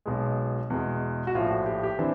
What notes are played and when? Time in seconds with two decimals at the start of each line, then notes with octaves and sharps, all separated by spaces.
0.06 B1 B2 G#3
0.70 E2 B2 G#3
1.27 F#4
1.35 A#1 A2 F3 F4
1.51 F#4
1.66 G4
1.83 G4
1.99 E3 C4 D4